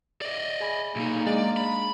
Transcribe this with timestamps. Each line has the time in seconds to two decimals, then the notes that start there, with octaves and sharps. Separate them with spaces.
0.21 D5 D#5
0.60 G#4 G#5 B5
0.96 B1 A#3 D#4
1.27 G#3 D4 D5
1.57 B5